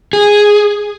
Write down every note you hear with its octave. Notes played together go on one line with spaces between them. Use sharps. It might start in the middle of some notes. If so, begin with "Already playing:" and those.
G#4